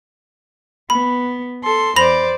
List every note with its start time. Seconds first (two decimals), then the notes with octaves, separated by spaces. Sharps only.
0.90 B3 B5
1.63 A4 C6
1.96 E2 C5 D5 B5 A#6 F7